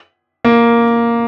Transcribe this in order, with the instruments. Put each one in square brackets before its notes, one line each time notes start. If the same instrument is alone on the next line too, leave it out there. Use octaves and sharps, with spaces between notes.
[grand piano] A#3